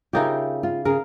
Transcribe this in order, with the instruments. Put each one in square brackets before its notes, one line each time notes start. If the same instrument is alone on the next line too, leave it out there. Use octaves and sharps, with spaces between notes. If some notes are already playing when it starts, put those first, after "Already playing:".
[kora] C#3 D#4 G4 [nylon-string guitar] F4 A#4 E5
[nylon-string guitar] F4
[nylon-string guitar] C#3 G#4 [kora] A#4